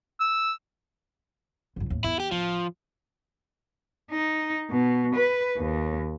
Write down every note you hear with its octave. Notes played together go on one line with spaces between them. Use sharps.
E6
C#2 F#2
D#2 A2
E2 E4
G4
A1 F3
D#4
B2
B4
D#2